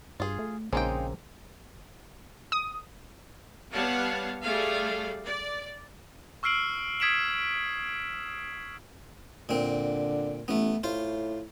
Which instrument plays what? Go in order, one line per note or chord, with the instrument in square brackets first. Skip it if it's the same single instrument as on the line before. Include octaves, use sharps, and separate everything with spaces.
[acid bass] G2 [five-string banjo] F4 G#4
[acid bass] A3
[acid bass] A#1 [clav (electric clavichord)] C#3 A#3 C4 [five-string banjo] G#3 D#4 G5
[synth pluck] D#6
[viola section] G3 B3 C#5 F5 F#5 A5
G3 A3 G#4 D5 F5
D5
[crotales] C#6 E6 F6 C7 D7 F#7
D#6 G#6 B6 D7 E7 F#7
[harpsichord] A#2 C4 [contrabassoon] D3
[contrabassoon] A1 [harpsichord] A3 B3
[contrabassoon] A2 [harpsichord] F4 C5